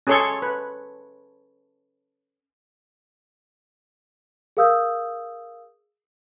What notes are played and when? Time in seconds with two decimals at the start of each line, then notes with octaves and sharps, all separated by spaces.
0.07 C#4 G#4 A4 C#5 C6 C#6
0.42 B4
4.57 G#4 A#4 F5 D#6 E6 G6